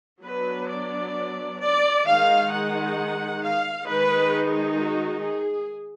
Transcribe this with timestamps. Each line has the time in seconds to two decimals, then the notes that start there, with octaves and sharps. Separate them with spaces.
0.22 F#3 B3 D4 B4
0.68 D5
1.58 D5
2.05 D#3 G#3 D#4 F5
2.50 F#5
3.41 F5
3.86 D#3 G#3 D#4 B4
4.78 F#4
5.22 G#4